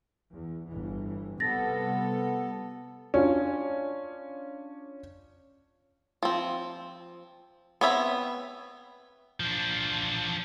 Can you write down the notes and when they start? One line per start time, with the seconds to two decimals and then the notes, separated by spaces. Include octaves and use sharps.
0.32 E2
0.67 G1 E3
1.40 C3 G3 B3 A4 A6 A#6
3.14 C#4 D4 F4
6.23 F3 C4
7.81 B3 C4 C#5 E5 B5
9.40 F3 D4